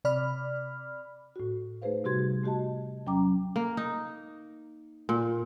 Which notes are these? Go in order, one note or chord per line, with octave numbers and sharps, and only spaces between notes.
C3 D5 B5 F6
A2 F#4
A3 D#4 G#4 B4 C5 F5
C3 G3 F#4 G4 C6 G#6
A3 F#4 G4 D#5 A5
E2 F#3 C#4 G5 A#5 D6
A#3
D#4
A#2